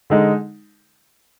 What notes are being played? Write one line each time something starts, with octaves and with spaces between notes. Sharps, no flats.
D3 G#3 D#4